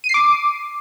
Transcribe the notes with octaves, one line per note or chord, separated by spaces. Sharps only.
D#7
C7
D6